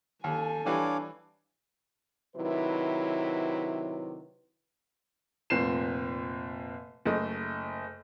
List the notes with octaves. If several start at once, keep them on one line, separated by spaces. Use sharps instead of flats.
D#2 A4 G#5
E3 G3 D4 C#5 F5 D6
C3 D#3 F#3 E4 B4
F1 A#2 C4 C7 E7
F#1 A3 D#5